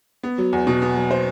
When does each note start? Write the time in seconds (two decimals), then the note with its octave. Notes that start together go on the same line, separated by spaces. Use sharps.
0.23 B3
0.38 F#3
0.53 E2
0.67 B2
0.82 B3
0.96 F#3
1.11 C5